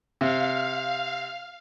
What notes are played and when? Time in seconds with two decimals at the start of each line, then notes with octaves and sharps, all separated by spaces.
0.21 C3 F5